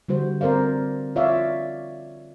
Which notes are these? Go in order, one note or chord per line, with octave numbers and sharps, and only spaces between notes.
D3 G3 F#4 C5
C4 A#4 C5 D5 F5
F4 C#5 D5 E5 F5